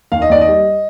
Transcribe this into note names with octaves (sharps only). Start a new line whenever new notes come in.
D#2 F5
D#5
D#2 D5
D#5
G3